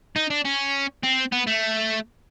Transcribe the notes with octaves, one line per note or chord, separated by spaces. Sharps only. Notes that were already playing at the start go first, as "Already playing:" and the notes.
D#4
D4
C#4
C4
B3
A3